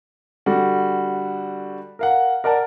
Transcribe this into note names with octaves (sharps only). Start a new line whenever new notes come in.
D3 G3 F#4
A#4 F5 F#5
A#4 D5 F#5 A5